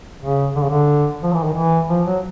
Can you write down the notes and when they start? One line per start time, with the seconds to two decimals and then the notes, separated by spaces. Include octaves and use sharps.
0.23 C#3
0.56 D3
0.63 C#3
0.70 D3
1.23 F3
1.33 E3
1.44 D#3
1.54 E3
1.90 F3
2.07 F#3